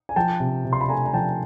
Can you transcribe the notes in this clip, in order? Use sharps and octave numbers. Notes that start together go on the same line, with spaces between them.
G#5
F3 G5 A5
C3
C3
C6
B5
A3 G#5 A#5
A#5
F3 G5 A5